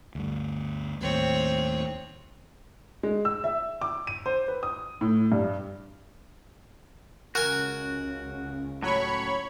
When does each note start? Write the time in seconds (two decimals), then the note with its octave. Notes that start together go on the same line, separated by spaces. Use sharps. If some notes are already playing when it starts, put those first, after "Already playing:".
0.15 D2 G2
1.01 D#2 A2 C4 C#5
3.03 G#3
3.25 E6
3.44 E5
3.81 D6
4.07 D#7
4.26 C5
4.48 B4
4.63 D#6
5.01 A2
5.32 G2
7.35 C#2 C#3 F#4 A#4 G#5
8.83 A2 F#3 C#5 B5 C#6